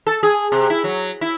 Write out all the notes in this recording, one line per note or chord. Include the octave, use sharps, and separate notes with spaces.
A4
G#4
C3
E4
F#3
E4